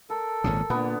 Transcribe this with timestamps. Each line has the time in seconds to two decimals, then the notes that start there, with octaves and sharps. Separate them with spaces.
0.10 A4 A#4
0.44 G#1 A#2 C#3
0.70 A#2 D3 B3